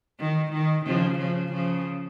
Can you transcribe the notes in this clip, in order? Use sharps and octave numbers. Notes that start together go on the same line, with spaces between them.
D#3
D#3
C#3 F3
C#3 F3
C#3 F3